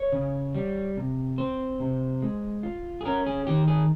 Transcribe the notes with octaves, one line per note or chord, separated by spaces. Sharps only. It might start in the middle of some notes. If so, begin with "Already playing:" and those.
Already playing: C#5
C#3
G3
C3
C4 C5
C3
G#3
F4
G#4
C#4 A#4
G#4
D#3 G4
G#4